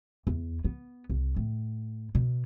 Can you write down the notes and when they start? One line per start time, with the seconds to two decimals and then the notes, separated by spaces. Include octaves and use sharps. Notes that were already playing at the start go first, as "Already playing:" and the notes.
0.27 E2
0.65 B3
1.10 C2
1.36 A2
2.15 B2